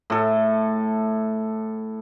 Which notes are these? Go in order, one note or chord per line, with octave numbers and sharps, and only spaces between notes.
A2 A4